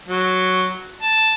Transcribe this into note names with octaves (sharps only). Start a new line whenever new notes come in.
F#3
A5